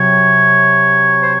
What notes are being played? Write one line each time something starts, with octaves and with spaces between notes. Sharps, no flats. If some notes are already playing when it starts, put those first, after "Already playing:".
Already playing: C3 F#3 C#5
C5